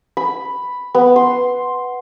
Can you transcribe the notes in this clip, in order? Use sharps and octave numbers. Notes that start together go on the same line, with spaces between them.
B5
B3
C6